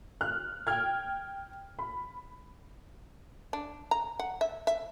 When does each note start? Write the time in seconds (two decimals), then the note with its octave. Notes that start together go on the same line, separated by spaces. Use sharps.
0.21 F6 F#6
0.67 G5 F6 G#6
1.79 B5
3.53 D4
3.91 A#5
4.19 F#5
4.41 E5
4.67 E5